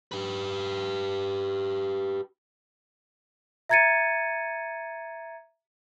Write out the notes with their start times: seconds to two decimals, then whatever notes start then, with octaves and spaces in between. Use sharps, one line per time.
0.12 G4 B4
3.69 E5 A#5 G#6 A6 C#7 D#7